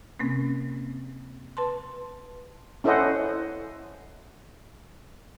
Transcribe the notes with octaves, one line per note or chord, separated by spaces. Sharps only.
C3 A#3 C4 C#4
B4 A5 C6
C#4 E4 A4 C5 D#5 F#5